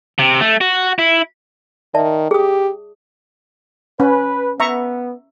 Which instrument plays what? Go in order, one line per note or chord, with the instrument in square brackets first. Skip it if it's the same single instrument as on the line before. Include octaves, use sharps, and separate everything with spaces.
[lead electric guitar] C3
A3
F#4
E4
[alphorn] D#3 [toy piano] D5 E5 A5
[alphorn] G4 [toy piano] G#4 D#6
[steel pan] C#4 [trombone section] B4
[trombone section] B3 [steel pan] E5 A#5 C#6